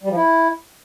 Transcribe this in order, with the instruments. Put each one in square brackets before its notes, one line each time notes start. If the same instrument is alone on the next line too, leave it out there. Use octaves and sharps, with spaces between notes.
[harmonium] G3
F3
E4